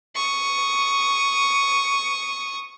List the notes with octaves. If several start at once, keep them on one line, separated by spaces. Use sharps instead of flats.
C#6 D#6